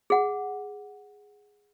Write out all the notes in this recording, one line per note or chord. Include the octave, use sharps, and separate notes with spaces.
G#4 F#5